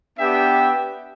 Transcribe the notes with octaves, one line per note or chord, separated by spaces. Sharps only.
B3 D4 G4 E5 G5